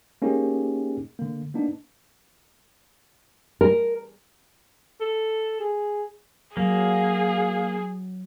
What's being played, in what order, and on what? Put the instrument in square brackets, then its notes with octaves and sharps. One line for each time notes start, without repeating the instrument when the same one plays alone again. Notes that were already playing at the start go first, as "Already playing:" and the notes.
[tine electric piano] A#3 C#4 D#4 G4 G#4 A#4
D3 A#3
A#3 B3 D4 D#4
[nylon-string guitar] A#4
[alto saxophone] A4
G#4
[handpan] F#3 [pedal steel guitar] A#3 [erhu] G#4 [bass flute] F5